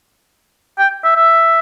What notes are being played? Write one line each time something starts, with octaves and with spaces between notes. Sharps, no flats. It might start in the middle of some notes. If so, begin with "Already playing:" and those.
G5
E5
E5